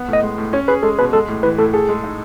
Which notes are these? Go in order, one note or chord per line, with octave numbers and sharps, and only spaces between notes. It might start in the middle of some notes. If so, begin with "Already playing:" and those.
Already playing: B3
A2
D#5
G#3
A2
C#4 C#5
G#4 B4
G#3 A4
B2 B4
G#3 A4
A2
E3 B4
A2 A4
G#4 A4
G#3
D#4